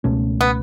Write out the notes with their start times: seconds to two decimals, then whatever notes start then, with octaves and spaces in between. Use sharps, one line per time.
0.04 C#2 B2 A3 C#4
0.41 B3